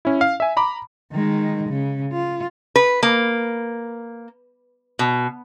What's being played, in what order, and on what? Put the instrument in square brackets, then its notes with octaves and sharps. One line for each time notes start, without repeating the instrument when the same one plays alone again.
[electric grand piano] C#4 E4
F5
E5 G#5
A#5 B5 D6
[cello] D#3 G#3
C#3
F4
[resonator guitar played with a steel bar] B4
A#3
B2